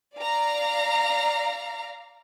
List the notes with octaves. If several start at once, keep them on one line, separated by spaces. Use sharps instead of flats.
D5 F5 A#5